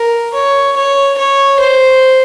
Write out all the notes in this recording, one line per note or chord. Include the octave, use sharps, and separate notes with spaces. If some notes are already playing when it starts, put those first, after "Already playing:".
Already playing: A#4
C#5
C#5
C#5
C5